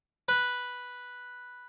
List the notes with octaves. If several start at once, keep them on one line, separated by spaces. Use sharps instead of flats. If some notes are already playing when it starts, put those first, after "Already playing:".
B4